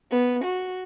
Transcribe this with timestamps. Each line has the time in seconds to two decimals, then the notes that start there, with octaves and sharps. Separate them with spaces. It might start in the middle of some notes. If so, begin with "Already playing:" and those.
0.11 B3
0.44 F#4